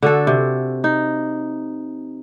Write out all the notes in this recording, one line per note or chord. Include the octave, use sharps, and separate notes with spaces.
D3 F#4 A4
C3
D#4